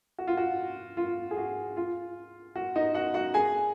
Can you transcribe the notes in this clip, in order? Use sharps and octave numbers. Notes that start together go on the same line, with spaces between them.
F#4
F4
F#4
F4
G#4
F#4
F4
F#4
D#4 D#5
F#4 F#5
F#4 F#5
G#4 G#5